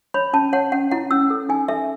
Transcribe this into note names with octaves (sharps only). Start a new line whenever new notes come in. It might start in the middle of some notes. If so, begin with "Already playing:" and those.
C#5 B5
C#4 A5
C#5 F#5
C#4 F#5
E4 F#5
C#4 E6
A4
D#4 G#5
A4 E5